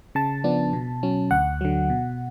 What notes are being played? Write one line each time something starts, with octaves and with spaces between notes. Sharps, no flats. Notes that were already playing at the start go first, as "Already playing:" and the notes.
C#3 A5
F3 B3 D4
B2
F#3 C#4
D2 F#5
D3 F#3
B2